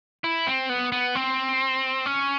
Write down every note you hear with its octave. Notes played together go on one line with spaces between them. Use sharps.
E4
C4
B3
B3
C4
C#4